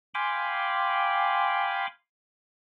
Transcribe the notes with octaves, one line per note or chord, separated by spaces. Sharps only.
F5 G5 G#5 B5 C6 D6